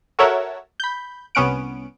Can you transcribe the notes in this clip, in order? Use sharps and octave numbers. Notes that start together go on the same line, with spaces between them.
F#4 A4 A#4 C#5 E5 F#5
B5 G6
C2 B3 C#4 F#5 D7